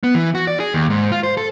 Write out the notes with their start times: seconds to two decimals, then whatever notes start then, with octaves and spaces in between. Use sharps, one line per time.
0.03 B3
0.15 E3
0.35 F#4
0.47 D5
0.60 G#4
0.74 D#2
0.90 G#2
1.12 F4
1.23 C5
1.37 A4